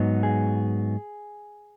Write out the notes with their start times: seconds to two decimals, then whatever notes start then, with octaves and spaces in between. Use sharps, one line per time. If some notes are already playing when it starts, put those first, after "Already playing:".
Already playing: G#2 F#3 B3 D#4
0.23 G#4